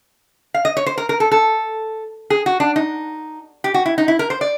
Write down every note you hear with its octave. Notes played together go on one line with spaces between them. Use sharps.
F5
D#5
C#5
C5
A#4
A#4
A4
A4
G#4
F#4
D4
D#4
G4
F#4
E4
D#4
E4
A#4
C5
D5